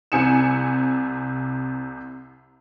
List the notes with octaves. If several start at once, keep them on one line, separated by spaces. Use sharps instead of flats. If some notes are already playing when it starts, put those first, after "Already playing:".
C2 C3 G#5 C#7 E7